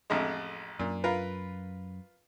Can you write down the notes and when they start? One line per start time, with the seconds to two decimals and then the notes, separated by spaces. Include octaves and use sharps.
0.10 A1 F2 G#3
0.79 F#2 A#2
1.04 F4 A#4 B4